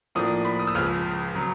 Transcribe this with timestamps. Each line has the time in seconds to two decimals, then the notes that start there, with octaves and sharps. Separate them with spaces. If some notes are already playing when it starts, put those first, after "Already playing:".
0.15 A2 F3 A#3 D4 D#6
0.45 B5
0.60 D#6
0.67 E6
0.75 C#2 C#3 F3 F6
1.35 C#3 F#3